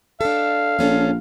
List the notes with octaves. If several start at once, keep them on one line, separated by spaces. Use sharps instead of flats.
D4 A4 F5
A#1 F3 C#4 A4